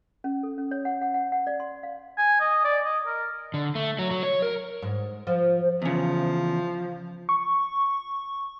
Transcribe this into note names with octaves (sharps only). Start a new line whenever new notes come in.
C#4
A4
C#4
C#5
F#5
F#5
F#5
F#5
D5
C6
F5
G#5
D#5
D5
D#5
A#4
D3
A3
F#3
F#3
C#5
A#4
G#2
F3
E2 C#3 F3
C#6